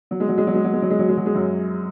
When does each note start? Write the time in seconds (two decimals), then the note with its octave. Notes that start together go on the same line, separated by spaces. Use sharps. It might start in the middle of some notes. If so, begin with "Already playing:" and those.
0.11 F#3
0.20 G#3
0.28 F#3
0.38 G#3
0.47 F#3
0.55 G#3
0.64 F#3
0.73 G#3
0.82 F#3
0.91 G#3
0.99 F#3
1.09 G#3
1.17 F#3
1.26 G#3
1.35 F#2 F#3